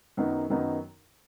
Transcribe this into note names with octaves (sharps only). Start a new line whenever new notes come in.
F#2 D#3 F#3 B3 D#4
F#2 D#3 F#3 B3 D#4